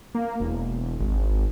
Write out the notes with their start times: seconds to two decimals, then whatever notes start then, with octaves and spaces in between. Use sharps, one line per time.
0.15 A#3
0.40 E1
1.00 G#1